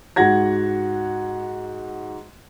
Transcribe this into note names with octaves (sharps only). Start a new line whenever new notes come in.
G#2 F#4 F#5 G#6 A#6